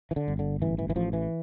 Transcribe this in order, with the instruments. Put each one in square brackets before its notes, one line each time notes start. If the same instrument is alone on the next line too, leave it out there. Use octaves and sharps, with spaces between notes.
[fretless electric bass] E3
D3
G1
D3
A1 E3
E3
E3
A1 F3
E3